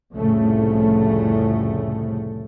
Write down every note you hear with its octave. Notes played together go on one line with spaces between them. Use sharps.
C2 F2 A2 C#3 A3